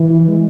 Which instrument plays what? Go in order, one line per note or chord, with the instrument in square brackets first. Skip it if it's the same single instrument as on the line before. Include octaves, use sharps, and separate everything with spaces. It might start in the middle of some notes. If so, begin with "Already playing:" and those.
Already playing: [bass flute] E3
G#3